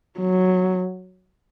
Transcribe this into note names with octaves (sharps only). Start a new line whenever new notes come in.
F#3